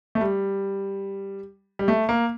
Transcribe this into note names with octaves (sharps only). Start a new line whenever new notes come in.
A3
G3
G3
A3
A#3